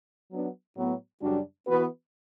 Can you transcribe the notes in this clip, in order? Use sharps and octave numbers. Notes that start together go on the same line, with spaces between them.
F#3 B3 D4
A2 F#3 B3
F#2 C#3 G3 D4 F#4
E3 B3 F#4 B4